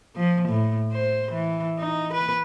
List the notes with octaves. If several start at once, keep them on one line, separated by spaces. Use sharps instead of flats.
F3
A2
C5
E3
D#4
B4